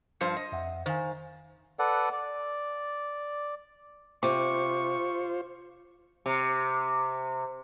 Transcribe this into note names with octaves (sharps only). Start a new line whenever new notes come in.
G2 F3 C5 C#7
D#5
F2 E5 F#5
D#3 C5 F5 G#5
A4 B4 D5 F#5
D5
C3 F4 C5 C#6 D6
C3